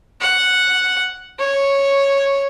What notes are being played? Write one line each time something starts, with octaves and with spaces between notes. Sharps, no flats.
F#5
C#5